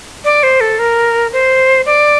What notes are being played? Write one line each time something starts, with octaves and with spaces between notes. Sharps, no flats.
D5
C5
A4
A#4
C5
D5